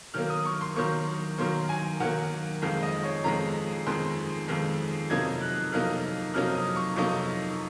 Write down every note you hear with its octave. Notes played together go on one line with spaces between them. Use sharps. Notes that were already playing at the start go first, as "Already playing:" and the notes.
D#3 F#3 A#3 F6
D#6
C#6
C6
D#3 F#3 A#3 C#6
D#3 F#3 A#3 C6
G#5
D#3 F#3 A#3 F#5
F2 D#3 G#3 F5
D#5
C#5
F2 D#3 G#3 A#5
F2 D#3 G#3 C6
F2 D#3 G#3
F2 C3 F#3 A#3 D#4 G#6
F#6
F2 C3 F#3 A#3 D#4 F6
F2 C3 F#3 A#3 D#4 F6
D#6
C#6
F2 C3 F#3 A#3 D#4 C#6